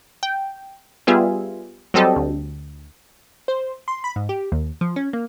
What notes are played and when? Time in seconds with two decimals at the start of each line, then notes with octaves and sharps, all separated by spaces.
0.23 G5
1.07 G3 B3 F4 G#4 E5
1.94 F#3 G3 C4 G4 A4 D#5
2.16 D2
3.48 C5
3.88 C6
4.04 B5
4.16 G#2
4.29 G4
4.52 D#2
4.81 F3
4.96 C#4
5.13 A#3